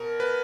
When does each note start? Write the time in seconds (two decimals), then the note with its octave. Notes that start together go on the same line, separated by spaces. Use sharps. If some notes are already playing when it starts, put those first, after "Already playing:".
Already playing: B2 A#4
0.20 B4